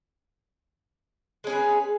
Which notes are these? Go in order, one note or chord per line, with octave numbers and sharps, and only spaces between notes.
G#3 C#4 G#4 B4